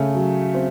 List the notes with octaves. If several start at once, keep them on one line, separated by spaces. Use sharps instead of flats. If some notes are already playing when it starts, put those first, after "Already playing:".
Already playing: C#3 A3
F#3
C4